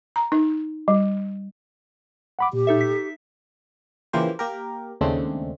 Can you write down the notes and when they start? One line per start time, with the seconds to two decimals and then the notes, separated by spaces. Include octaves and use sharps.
0.16 A#5
0.32 D#4
0.88 G3
2.39 F#5 B5 D6
2.53 A#2 G4
2.67 D#4 A4 E5
2.81 B6
4.13 C#3 E3 F3 A#3 G4 C5
4.39 A#3 G4 A#4
5.01 D#2 C#3 G#3 A3 C4 D4